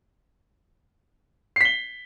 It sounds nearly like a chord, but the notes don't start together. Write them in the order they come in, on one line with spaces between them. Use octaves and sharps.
C7 B6 G7